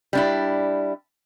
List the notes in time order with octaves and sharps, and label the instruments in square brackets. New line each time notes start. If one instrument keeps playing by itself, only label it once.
[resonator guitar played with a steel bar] G3 D4 E4